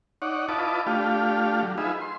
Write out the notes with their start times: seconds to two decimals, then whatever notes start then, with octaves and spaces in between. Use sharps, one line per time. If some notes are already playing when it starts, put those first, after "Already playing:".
0.22 D#4 C#5 D5 F#5
0.49 E4 F4 B4 D#5 A5 D6
0.87 A3 D4 F4 G4 F5
1.63 F#3
1.78 D#4 F4 G#4 B4 E5
2.01 C6